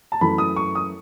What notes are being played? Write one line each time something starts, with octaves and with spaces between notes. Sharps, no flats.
A5
F#2 E3 A3 B5
D#6
C#6
D#6